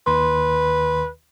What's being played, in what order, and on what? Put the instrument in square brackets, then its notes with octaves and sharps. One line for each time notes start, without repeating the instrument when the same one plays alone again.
[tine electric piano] D#2 D#3 C6 [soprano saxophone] B4